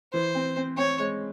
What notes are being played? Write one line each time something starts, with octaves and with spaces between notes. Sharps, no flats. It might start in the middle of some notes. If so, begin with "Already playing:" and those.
E3 C5
C4
C4
C4 C#5
G#3